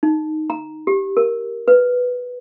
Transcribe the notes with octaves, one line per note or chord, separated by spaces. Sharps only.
D#4
A#5
G4
A#4
B4